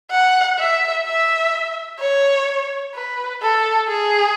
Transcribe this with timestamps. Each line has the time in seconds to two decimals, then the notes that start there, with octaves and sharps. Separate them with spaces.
0.11 F#5
0.59 E5
1.06 E5
2.00 C#5
2.94 B4
3.42 A4
3.88 G#4